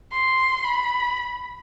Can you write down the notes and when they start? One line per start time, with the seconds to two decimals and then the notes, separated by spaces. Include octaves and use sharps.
0.12 C6
0.64 B5